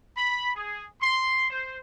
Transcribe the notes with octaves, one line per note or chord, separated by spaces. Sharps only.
B5
G#4
C6
C5